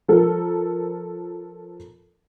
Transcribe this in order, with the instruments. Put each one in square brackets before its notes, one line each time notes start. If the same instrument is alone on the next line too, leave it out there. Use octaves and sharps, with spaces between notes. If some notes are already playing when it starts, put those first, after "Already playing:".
[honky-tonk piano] F3 A4 A#4